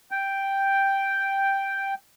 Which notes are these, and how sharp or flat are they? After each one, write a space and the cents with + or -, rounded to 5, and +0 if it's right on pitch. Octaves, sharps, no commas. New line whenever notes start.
G5 +0